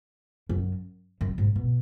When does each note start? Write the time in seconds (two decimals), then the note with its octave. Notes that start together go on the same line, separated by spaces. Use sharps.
0.49 F#2
1.21 F#2
1.38 G#2
1.56 B2